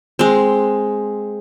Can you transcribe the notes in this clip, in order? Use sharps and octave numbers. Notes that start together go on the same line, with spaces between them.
G#3 C4